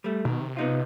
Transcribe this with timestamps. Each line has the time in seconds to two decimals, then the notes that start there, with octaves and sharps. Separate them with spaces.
0.04 G3 A3
0.25 B2 D#3
0.40 C3
0.57 B3 D#4 F4